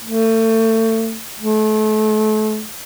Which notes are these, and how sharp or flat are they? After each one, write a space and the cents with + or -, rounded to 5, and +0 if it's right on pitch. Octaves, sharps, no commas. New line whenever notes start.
A3 +30
A3 -35